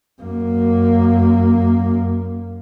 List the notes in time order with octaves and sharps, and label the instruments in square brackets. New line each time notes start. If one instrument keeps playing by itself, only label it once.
[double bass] F#2 A#3